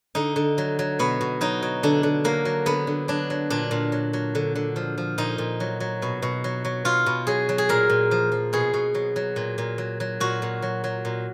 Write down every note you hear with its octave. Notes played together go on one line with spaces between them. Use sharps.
D3 D#4
D3
F#3
F#3
B2 B3
B2
F#3 D#4
F#3
D3 D4
D3
F#3 A#3
F#3
D3 B3
D3
F#3 D4
F#3
A#2 D4
A#2
F#3
F#3
D3
D3
F3
F3
A#2 D#4
A#2
F#3
F#3
B2
B2
F#3
F#3
B2 F4
B2
F#3 G#4
F#3
G#4
A#2 A#4
A#2
F3
F3
B2 G#4
B2
F#3
F#3
A#2
A#2
F#3
F#3
A#2 F#4
A#2
F#3
F#3
A#2